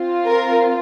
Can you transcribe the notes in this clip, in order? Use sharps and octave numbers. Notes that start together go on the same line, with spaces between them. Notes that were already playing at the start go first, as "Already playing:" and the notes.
Already playing: C4 F4
A#4